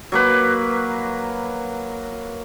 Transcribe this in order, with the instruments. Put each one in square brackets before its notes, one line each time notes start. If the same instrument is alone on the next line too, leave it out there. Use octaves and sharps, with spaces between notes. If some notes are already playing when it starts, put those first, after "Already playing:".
[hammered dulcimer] F#3 A#3 B4